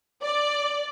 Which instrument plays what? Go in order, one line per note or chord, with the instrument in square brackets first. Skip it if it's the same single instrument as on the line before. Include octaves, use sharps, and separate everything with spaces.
[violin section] D5